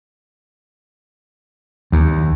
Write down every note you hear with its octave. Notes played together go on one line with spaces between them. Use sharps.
D#2